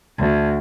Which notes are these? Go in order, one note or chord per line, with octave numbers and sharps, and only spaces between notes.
D2